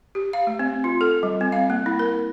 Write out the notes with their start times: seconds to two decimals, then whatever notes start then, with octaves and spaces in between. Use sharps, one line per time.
0.15 G4
0.33 F5
0.47 A3
0.59 C4
0.84 F4
1.01 A4
1.23 G3
1.41 C4
1.52 F5
1.70 A#3
1.86 E4
1.99 A#4